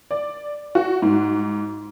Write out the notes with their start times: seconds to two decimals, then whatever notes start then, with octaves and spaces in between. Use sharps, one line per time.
0.11 D5
0.75 F#4
1.02 G#2